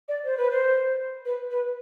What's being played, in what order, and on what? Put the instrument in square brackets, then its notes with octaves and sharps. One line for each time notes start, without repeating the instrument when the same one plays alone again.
[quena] D5
C5
B4
C5
B4
B4